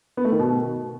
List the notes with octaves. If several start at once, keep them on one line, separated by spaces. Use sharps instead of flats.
B3
A3
D#3
B2